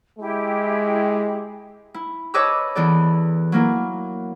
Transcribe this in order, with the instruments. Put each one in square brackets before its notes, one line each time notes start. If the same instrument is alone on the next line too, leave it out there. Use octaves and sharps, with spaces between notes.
[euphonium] G#3 [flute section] E4 G4
[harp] E4
B4 C#5 D#5 A5 D6 E6
E2 E3 A4 D5
F#3 A#3 E4